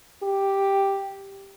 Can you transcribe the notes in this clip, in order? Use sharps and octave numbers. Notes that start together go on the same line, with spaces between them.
G4